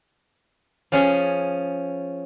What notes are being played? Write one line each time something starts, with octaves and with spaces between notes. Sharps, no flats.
F3 C#4 G#4 G#5